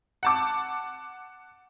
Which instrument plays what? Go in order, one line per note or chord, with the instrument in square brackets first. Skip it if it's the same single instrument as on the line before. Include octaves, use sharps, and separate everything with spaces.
[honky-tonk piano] F#5 A5 D6